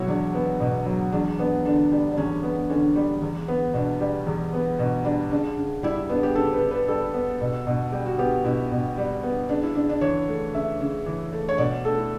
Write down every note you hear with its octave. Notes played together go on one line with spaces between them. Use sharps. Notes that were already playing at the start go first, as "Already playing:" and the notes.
Already playing: B2 F#3 E4 F#4 C#5
E2 D4
B3
B2
F#3
E2 D4
B3 D4
D3 D4
G3
D4
E2 C#4
B3
D3 C#4
G3
E2
B3
B2 D4
G3
E2
B3
B2
G3 D4
C#3 D4
C#3
G3 E4
E4
B3 D4
G4
C#3 A4
B4
C#3
B4
G3 A4
B3
B2
B2
G3 G4
F#4
B3 G4
B2 E4
B2
G3
B3
C#3 D4
E4
C#3 D4
D4
E3 C#5
A3
C#3 E5
C#3
E3
A3
C#5
B2 D5
A3 A4
E4